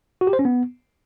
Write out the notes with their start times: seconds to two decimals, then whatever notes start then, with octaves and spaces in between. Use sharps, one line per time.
0.21 F#4
0.27 G4
0.33 C5
0.39 C#4
0.45 B3